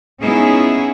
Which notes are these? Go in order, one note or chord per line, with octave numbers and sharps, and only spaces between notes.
G#3 B3 C#4 D#4 E4 G#4